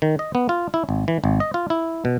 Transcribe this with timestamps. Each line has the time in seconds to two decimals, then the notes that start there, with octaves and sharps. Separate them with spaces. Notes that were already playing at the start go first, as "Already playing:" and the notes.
0.02 D#3
0.19 D#5
0.35 B3
0.49 F4
0.74 E4
0.89 G#1
1.08 E3
1.24 G#1
1.40 D#5
1.54 F4
1.70 E4
2.05 B2